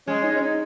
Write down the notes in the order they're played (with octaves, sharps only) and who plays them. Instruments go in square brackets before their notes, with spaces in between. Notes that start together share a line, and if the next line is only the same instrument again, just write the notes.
[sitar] G#3 [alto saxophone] C#4
[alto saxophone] D#4
C#4
D#4